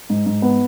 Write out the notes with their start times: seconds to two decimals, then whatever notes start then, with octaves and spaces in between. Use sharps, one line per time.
0.10 G#2
0.26 G#2
0.42 B3